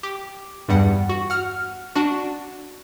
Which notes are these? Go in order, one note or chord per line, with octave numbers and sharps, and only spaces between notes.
G4
E2 G2 G3 F#5
F#4
F#5 F6
D4 F#4